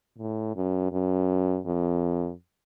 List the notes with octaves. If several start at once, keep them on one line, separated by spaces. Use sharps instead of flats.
A2
F#2
F#2
F2